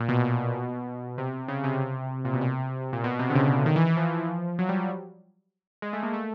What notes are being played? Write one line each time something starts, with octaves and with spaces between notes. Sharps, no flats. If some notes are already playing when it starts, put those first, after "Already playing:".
Already playing: A#2
B2
B2
C3
C#3
C3
A#2
B2
C3
A#2
B2
C3
D3
C#3
D#3
E3
E3
F3
F#3
G3
G#3
A3
A#3
A3